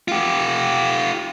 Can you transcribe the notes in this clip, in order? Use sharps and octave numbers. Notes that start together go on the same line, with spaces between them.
F4 G4